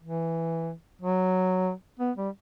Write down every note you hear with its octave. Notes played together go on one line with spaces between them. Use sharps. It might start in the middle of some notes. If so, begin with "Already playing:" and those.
E3
F#3
B3
G3